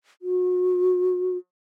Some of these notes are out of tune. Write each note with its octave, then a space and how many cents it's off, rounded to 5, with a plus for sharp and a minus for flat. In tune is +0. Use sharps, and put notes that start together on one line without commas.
F#4 -30